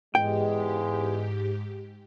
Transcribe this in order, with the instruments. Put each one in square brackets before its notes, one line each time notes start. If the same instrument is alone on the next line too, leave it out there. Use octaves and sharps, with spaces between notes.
[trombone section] E2 G#3 [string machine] G#2 G4 [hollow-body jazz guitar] G5